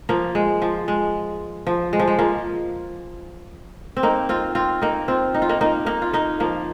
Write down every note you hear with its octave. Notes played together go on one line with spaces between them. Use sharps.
F3 A#3
G#3
F3
G#3
F3
G#3
F3
G#3
F3 A#3
C4
A#3 D#4
C4 F4
C4 F4
A#3 D#4
C4 F4
D#4
F4
A#3 D#4
A#3 D#4
A#3 D#4
F4
A#3 D#4
F3 A#3